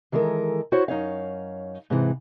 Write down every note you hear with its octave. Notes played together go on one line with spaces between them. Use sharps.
D#3 E3 G#3 A4 A#4
E4 F#4 C5 C#5
F#2 D#4 C#5 F5
G#2 C3 E3